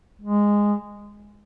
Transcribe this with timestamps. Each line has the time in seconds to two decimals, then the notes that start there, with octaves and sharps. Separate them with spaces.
0.21 G#3